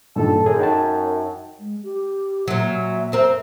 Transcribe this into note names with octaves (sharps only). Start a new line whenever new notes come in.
G2 A#2 D#3 A4
F#2 G#4
D#4 G5 A5
G#3
G4
A#2 F#3 E5
F#2 C4 A#4